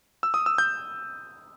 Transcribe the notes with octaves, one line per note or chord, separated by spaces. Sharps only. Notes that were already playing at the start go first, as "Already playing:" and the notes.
E6
D#6
E6
G6